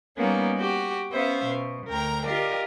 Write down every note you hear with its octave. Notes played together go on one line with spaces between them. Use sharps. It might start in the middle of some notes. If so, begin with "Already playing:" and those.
G3 A#3 B3 C#4 D#4
F#4 G4
B3 C#4 C5 E5 F5
B2
D2 A#4 G5 A#5
F4 G4 A#4 D5 D#5